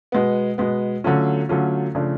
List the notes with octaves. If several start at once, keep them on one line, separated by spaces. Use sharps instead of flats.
B2 G#3 B3
B2 G#3 B3
D3 F#3 A3 C#4 F4
D3 F#3 A3 C#4 F4
C#3 F3 A3 D4